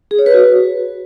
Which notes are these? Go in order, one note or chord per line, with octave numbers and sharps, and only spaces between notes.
G#4
C#5
B4
F#4